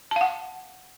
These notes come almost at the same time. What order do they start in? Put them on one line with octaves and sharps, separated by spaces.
A5 F5 F#5